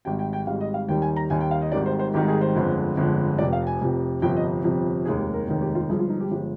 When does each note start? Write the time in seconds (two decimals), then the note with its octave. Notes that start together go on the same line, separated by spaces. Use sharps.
0.05 G#1 G#2 G3 G5
0.19 G5
0.33 G5
0.46 G#1 G#2 G3 F5
0.61 D#5
0.74 F5
0.88 D#2 D#3 G3 G5
1.02 G#5
1.16 A#5
1.30 D#2 D#3 G3 G#5
1.41 G5
1.51 F5
1.62 D#5
1.72 G#1 G#2 D#3 G3 D5
1.86 C5
1.99 C5
2.14 G#1 G#2 D#3 G3 G4
2.28 G#4
2.41 C5
2.55 G1 F2 D3 G#3
2.97 G1 F2 D3 G#3
3.38 F1 F2 C3 D5
3.53 F5
3.67 G#5
3.81 F1 F2 C3
4.22 G1 F2 C3 F3 G5
4.36 D#5
4.64 G1 F2 C3 F3
5.05 F1 D#2 D#3 G#3 G#4
5.19 G4
5.33 A#4
5.47 F1 D#2 D#3 G#3 G#4
5.62 G4
5.75 F4
5.89 G1 G2 F3 G#3 G#4
5.99 F4
6.09 D#4
6.20 G4
6.31 G1 F3 G#3